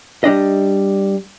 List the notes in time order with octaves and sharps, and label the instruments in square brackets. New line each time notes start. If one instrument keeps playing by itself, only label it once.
[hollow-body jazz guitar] G3 D4 D#5